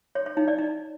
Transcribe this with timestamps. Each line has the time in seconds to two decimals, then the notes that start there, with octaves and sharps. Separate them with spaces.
0.15 C#5
0.26 C#5
0.37 D#4
0.48 D5
0.58 D#4